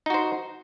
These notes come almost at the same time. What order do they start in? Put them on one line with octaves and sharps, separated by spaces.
D#4 F#4 C5